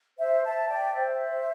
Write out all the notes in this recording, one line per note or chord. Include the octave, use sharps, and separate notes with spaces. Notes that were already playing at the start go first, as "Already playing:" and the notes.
C5 E5
E5 A5
D5 G5
C5 E5